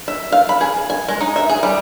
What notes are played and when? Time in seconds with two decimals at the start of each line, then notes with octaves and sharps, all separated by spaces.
0.08 E5
0.32 F5
0.49 B5
0.61 G#4
0.90 G#5
1.08 G#3
1.21 D#4
1.36 E5
1.49 G#4
1.63 G3